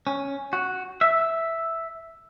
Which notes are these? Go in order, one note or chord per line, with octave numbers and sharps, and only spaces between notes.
C#4
F#4
E5